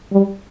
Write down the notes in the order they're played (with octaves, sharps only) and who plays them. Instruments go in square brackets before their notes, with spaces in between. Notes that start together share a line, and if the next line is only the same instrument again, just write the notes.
[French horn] G3